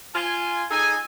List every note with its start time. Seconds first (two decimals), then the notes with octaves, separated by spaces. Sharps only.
0.15 F4 G#5
0.71 D#4 G#4 A4 G#5